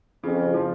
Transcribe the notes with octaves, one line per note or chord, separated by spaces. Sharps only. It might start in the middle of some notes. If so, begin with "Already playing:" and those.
F2 C#3
F3